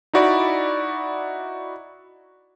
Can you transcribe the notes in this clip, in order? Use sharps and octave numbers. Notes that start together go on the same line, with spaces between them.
D#4 E4 F#4 D5 B5